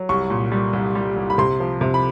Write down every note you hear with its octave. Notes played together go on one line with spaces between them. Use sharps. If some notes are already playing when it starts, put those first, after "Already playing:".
Already playing: F#3
C2 C#6
A#2
G3
C2
G3
C2
B5
C3 C6
F3
C3
B5